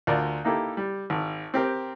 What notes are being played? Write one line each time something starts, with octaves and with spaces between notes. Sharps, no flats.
D2 F4 A#4 D5
A#3 D#4 E4 G4 A4
G3
G#1
C4 G4 A#4